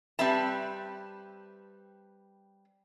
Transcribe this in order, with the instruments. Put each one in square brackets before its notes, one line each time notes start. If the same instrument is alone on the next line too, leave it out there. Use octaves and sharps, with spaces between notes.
[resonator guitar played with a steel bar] G3 C4 B4 E5 A5